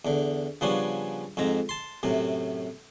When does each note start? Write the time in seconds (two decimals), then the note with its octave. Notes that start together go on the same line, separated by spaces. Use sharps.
0.05 E2 D3
0.61 C#3 F3 G3 B3 C#4 D4
1.37 F2 G#2 C4 A#5
1.69 A5 C6
2.03 F#2 A2 C3